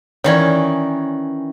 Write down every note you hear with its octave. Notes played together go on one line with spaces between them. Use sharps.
D#3 E3 C#4 C#5 D5